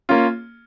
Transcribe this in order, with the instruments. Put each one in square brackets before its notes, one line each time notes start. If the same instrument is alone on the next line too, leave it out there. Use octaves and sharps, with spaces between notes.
[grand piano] A#3 C#4 F4